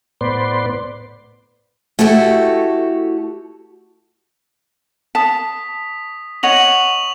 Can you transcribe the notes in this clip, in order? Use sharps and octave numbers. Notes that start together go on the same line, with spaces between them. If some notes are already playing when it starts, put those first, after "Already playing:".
A2 B3 B4 C5 D5 C6
A3 E4 F#4 G4 A4
A5 D#6 B6
C#5 D#5 F#5 C#6 F7 F#7